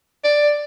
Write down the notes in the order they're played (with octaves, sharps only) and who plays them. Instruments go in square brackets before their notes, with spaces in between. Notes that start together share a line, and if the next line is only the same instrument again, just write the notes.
[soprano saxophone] D5